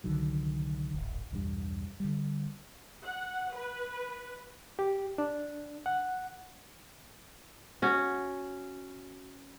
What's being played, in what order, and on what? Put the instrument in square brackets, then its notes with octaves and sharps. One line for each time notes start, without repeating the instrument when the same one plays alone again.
[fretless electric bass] C2 D3 D#3 F#3
D1 G#1
B1 E2 G2
D3 G3
[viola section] F#5
B4
[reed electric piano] G4
D4
F#5
[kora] C#4 F#4